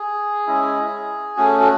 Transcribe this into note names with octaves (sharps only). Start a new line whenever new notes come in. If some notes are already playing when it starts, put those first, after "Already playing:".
Already playing: G#4
G#3 C#4 E4
A3 C#4 F#4
F#4